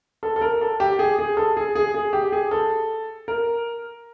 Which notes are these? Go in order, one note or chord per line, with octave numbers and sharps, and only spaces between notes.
A4
A4
A#4
A4
G4
G#4
G#4
A4
G#4
G#4
G#4
G4
G#4
A4
A#4